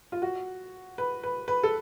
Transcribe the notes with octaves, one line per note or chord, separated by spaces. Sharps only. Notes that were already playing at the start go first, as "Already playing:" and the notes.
F4
F#4
B4
B4
B4
A4